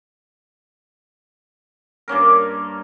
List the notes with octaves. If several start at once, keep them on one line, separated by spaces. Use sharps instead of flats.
G2 A#3 C#4 A#4